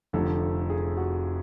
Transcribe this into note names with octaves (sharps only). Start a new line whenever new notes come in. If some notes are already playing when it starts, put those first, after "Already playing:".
F1 F2 D3 F3 A4
G#4
F#4